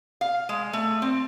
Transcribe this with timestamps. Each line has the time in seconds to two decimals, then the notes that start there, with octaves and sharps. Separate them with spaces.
0.21 F5
0.49 G#3
0.73 A3
1.02 C4